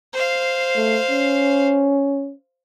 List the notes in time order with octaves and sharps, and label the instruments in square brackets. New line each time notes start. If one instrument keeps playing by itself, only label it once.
[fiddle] C5 F5
[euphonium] A3
C#4